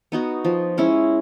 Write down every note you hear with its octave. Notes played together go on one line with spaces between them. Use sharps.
B3 D#4 F#4
F3
G#3 C#4 E4